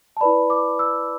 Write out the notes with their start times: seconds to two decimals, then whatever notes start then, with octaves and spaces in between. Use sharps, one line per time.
0.17 A5
0.21 E4 B4 D5 B5
0.50 D6
0.79 E6